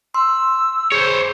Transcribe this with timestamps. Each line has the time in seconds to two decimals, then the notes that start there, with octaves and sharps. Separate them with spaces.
0.14 C6 E6
0.92 G#4 C5 C#5